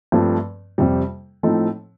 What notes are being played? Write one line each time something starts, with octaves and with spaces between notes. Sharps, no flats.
G2 F3 A3 C4
F2 C3 G3
A2 F3 C4 D#4 A4